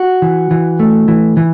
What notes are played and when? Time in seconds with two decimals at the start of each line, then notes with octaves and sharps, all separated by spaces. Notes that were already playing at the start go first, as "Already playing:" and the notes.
Already playing: F#4
0.22 E3
0.51 E3
0.80 A3
1.08 E3
1.37 E3